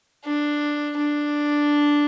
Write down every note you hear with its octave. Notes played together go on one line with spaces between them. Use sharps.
D4
D4